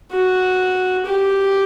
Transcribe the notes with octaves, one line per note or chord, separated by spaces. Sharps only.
F#4
G4